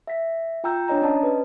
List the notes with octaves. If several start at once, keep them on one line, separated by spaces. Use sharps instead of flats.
E5 B6
F4 G5 A#5 E6 G6
D4 C#5 D#5 A#5
C#4 D5 D#5 A5
B4